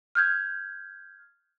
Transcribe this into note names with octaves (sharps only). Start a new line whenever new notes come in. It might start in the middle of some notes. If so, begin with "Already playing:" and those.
F6 G6 G#6